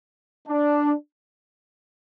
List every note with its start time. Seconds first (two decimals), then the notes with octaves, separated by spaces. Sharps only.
0.48 D4